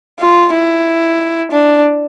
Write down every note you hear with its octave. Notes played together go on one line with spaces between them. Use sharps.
F4
E4
D4